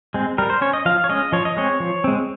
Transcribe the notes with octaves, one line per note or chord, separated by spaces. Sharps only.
G#3 C4
G3 A#4
C5
C#4 C#5
D#5
F3 F5
C#5
G#3 C#4 D#5
F3 C#5
D#5
G#3 C4 C#5
F3
G#3 C4